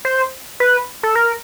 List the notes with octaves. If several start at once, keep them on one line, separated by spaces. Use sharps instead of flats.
C5
B4
A4
A#4